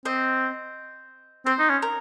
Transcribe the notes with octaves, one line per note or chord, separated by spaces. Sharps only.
C4 C5 D#5
C4 C5
D#4
C#4
A#4